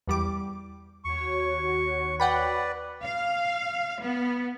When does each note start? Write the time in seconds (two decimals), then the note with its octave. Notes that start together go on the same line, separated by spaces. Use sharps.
0.08 E2 G3 D6
1.04 D#2 F#4 C#5 C#6
2.20 B4 D5 F#5 G5 B5
3.03 F5
4.02 B3